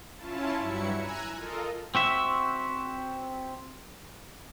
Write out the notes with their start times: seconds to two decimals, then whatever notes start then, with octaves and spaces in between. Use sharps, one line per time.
0.16 C#4 E4 F4 A5
0.57 G2 F#3 E4 C#7
0.97 G#5 A#5 E6 F#6 G#6
1.35 F4 A4 A#4 D#5
1.95 C4 F#4 E5